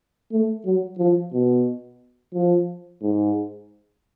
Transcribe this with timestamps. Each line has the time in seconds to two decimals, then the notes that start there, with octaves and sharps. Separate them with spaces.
0.32 A3
0.65 F#3
0.98 F3
1.33 B2
2.34 F3
3.01 G#2